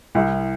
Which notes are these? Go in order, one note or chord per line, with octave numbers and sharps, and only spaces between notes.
C2 E4